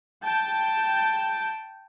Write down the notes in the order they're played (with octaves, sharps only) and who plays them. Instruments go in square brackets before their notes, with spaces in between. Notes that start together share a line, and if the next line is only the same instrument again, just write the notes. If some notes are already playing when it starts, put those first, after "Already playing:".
[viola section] G5 A5